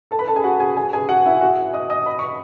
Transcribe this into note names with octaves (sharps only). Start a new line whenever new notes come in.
A4 A5
B4 B5
A4 A5
G#4 G#5
F#4 F#5
G#4 G#5
G#4 G#5
G#4 G#5
F#4 F#5
E4 E5
F#4 F#5
D#5 D#6
D#5 D#6
B5
C#6